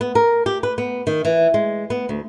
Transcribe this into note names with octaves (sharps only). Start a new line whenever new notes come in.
B3
A#4
G4
B4
B3
D#3
E3
G#3
B3
D2